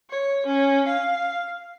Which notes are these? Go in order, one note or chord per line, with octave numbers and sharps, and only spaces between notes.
C#5
C#4
F5